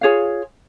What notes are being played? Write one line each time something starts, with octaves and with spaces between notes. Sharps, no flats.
F4 G#4 C#5 F5